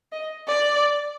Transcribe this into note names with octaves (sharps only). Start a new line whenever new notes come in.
D#5
D5